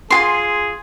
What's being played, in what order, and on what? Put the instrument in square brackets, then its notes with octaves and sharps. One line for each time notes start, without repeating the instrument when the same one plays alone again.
[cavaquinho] F4 F#4 C6 [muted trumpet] G#4